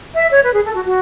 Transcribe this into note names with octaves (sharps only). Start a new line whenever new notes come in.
E5
C#5
B4
G#4
A4
F#4
F#4